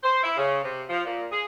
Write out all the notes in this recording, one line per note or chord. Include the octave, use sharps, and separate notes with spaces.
C5
E4
C#3
C3
F3
A#2
G#4